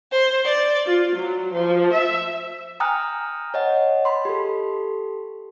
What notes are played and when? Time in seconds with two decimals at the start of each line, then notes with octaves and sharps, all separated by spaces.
0.12 C5
0.44 D5
0.86 F4
1.15 F#3
1.53 F3
1.91 E5
2.80 G5 G#5 A#5 D#6 F6 F#6
3.54 C#5 D#5 F#5
4.05 B5 C6
4.25 G4 A4